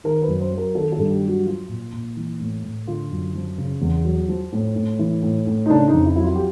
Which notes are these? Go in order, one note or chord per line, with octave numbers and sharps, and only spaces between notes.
D#3 A#4
B4
F#2
C5
F#3
A#4
D#3 A4
A4
G2
G4
F#3 F#4
F3 F4
A#2
A#2
E3
A2
A2
D3 F4
F#2
F3
C#3
E2
F#3
F3
A2
A2
E3
A2
A2
D#4
C#3 D4
D#4
F2
E4
F#3 E4
F4
G4